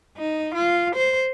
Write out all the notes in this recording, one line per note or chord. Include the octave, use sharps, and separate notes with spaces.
D#4
F4
C5